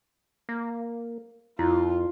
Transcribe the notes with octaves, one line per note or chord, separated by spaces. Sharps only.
A#3
F2 E4 F4